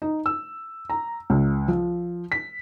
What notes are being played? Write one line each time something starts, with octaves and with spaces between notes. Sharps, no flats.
D#4
E6
A#5
C#2
F3
B6